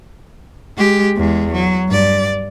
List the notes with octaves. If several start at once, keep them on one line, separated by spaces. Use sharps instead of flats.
G#3 G4
E2 G#3
F#3
G2 D5